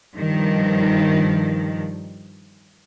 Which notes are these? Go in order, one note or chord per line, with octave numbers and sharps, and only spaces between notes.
G2 D#3 F3